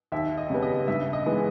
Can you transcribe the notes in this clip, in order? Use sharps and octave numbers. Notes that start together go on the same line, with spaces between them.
D#2 E5
D#5
C#3 G3 B3
D#5
G2 E5
D#5
E3 G#3 B3